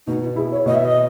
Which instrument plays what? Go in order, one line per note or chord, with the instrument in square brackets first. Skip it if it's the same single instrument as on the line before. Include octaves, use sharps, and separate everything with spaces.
[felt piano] B2 [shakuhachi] D#4
[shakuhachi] E4
[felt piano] E4 [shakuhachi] G#4
[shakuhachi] C#5
[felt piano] B2 [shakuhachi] D#5
[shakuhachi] E5
D#5